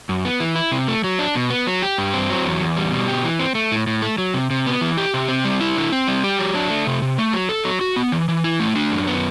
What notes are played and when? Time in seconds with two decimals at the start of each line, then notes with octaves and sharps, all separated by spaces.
0.09 F#2
0.25 B3
0.40 E3
0.56 E4
0.72 C3
0.88 A3
1.04 F#3
1.19 D4
1.35 B2
1.50 B3
1.67 F#3
1.82 G4
1.98 G2
2.13 C4
2.30 F#3
2.45 E2
2.61 E2
2.77 G3
2.92 B2
3.08 G4
3.24 E3
3.39 C4
3.55 A3
3.72 A2
3.87 A2
4.02 A3
4.18 F#3
4.34 C3
4.51 C3
4.66 B3
4.81 E3
4.97 G4
5.14 C3
5.28 C4
5.45 G3
5.60 E4
5.76 D3
5.92 C4
6.08 G3
6.24 G4
6.39 F#3
6.55 D4
6.70 A3
6.87 C3
7.02 C3
7.18 A3
7.33 F#3
7.49 A4
7.65 F#3
7.81 F#4
7.96 B3
8.12 E3
8.28 E3
8.44 E4
8.60 A3
8.76 D4
8.91 F#2
9.07 B3